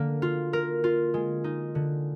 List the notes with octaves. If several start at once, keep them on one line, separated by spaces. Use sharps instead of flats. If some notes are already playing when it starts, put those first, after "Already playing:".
Already playing: D3 A#3
F4
A#4
F4
G#3
D#4
D3